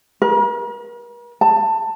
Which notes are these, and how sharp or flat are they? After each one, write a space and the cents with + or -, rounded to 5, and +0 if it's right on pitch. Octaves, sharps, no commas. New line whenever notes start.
A#4 +45
A5 +15